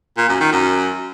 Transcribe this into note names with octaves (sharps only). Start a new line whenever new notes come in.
A#2
F#2
D#3
F#2